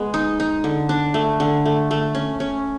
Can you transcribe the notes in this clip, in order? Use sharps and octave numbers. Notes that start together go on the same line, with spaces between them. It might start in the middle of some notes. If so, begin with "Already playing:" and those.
Already playing: G#3 B3
D#4
D#4
D3
D4
A3
D3
A3
A3
C#4
C#4